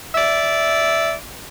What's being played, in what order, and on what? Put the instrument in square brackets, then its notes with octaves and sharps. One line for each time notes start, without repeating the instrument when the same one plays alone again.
[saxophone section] D5 E5